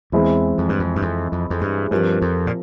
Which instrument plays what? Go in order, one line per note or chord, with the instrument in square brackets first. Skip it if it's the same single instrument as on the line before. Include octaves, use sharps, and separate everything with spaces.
[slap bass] E2 [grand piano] E3 G#3 C4 E4
[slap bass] F2
G2
F2
G2
F2
F2
F2
G2
[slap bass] G2 [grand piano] F3 C4 G4 A#4
[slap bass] F2
A#2